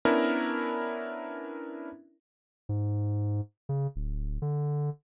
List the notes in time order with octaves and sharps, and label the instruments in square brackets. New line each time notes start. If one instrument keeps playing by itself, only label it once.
[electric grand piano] B3 C#4 D4 E4 A#4
[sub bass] G#2
C#3
D1
D3